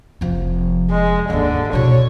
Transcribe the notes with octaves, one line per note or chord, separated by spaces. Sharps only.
F1 F3
G#3
D#2 G#2 D3
B2 E4 C#5